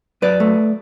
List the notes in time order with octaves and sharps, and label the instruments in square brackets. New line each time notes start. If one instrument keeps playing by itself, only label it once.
[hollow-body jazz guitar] F#2 B4 D5
A3